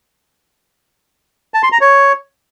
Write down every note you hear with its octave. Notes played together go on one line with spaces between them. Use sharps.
A5
C6
A#5
C#5